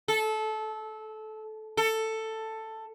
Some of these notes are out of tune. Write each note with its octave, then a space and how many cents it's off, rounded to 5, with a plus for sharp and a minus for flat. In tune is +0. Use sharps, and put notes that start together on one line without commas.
A4 -20
A4 +10